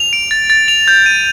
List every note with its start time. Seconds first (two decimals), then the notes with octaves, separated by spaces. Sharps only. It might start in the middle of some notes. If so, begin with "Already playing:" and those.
Already playing: F7
0.13 D7
0.31 A6
0.50 A6
0.68 F7
0.88 G6
1.06 D#7